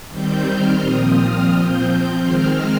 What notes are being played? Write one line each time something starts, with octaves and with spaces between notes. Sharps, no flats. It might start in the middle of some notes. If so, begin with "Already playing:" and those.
D#3 G3 C4 G6
F6
A#2 F3 C4 D#6
F6
F3 C4 G6
D#3 G#3 C4 F6